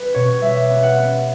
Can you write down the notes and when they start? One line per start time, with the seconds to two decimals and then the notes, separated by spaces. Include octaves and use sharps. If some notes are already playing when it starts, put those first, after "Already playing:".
Already playing: G3 B4
0.14 B2 C#5
0.41 G3 E5
0.70 B3
0.83 F#5
0.98 B3